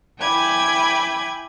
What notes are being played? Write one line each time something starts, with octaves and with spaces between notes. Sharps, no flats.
E4 G5 G#5 B5 D6 G#6